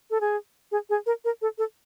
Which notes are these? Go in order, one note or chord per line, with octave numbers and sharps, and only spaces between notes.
A4
G#4
G#4
G#4
A#4
A#4
A4
A4